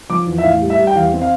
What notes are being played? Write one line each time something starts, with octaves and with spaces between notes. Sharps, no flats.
F3 D6
E2
E5
A2 F5
G3
E5
G3
G5
E2 F5
C4
F5